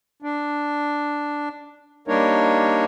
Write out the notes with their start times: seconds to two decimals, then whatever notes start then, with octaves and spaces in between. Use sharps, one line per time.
0.22 D4
2.08 G3 A#3 D4 D#4 A#4 C#5